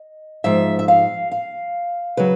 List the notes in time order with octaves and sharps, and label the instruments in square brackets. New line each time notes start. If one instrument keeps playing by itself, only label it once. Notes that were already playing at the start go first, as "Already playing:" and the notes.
Already playing: [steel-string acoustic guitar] D#5
G#2 F3 E5
E5
F5
F5
C#3 F#3 B4